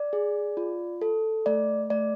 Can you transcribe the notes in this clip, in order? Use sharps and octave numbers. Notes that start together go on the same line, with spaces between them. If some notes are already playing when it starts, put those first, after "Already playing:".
Already playing: D5
G#4
F4
A4
A3 D5
A3 D5